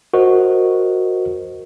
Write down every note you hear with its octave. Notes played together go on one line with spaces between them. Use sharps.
F#4 A#4 C5 D#5